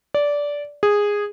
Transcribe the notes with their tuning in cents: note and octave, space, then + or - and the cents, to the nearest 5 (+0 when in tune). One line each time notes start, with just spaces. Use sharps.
D5 -15
G#4 -10